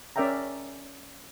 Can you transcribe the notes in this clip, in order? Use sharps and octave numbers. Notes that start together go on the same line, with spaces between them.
C#4 A#4 D5 E5 G5 A#5